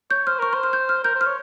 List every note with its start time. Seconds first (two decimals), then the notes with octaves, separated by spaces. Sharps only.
0.11 C#5 G6
0.27 C5 F6
0.39 A#4 C#6
0.53 C5 C6
0.63 F6
0.73 G6
0.89 F6
1.04 A#4 G6
1.15 C5
1.21 F6
1.26 C#5